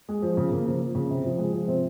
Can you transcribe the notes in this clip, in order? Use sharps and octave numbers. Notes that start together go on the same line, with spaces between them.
G#3
F3
C#3
C#3 A#3
F3
F3
C#3
C3
F3
G#3
F3
C3 C4